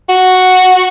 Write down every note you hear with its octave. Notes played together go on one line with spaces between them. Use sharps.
F#4